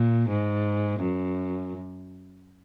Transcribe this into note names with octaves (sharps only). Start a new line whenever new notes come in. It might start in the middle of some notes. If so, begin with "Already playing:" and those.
Already playing: A#2
G#2
F#2